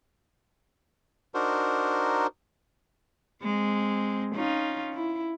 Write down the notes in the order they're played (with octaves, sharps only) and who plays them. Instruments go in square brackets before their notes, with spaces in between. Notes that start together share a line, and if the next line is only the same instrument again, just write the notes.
[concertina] D4 D#4 F#4 A#4 C5
[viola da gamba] G#3 C4
C#4 D#4 F4
E4